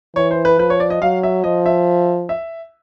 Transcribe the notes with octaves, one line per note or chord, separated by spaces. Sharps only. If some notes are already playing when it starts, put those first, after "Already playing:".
E3 C#5
C5
B4
F3 B4
C#5
D5
D#5
F#3 F5
E5
F3 D#5
E5
E5